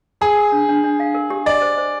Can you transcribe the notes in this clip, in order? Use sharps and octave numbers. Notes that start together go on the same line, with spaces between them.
G#4 A#4
A#4
D4
D4
D4
F5
A#4
G4
D5 D#5
C5
C5